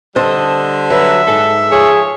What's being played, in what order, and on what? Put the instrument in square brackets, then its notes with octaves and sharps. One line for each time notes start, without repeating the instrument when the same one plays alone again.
[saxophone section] D3 G3 [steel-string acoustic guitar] A4 C5 D#5
[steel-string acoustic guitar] F#3 B4 [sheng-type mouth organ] E5
[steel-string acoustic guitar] G#2 [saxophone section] A4
[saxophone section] F3 C#5 [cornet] G#4